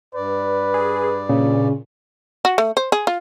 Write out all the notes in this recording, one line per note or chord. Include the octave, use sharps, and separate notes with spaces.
G2 B4 D5
G#4
A#2 C#3
F#4
A3
C5
G#4
F4